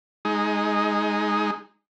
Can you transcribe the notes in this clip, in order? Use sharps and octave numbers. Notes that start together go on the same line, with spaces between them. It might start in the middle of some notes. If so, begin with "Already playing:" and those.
G#3 D#4